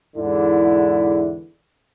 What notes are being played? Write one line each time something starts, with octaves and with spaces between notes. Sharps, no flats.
E2 G#2 D3 E4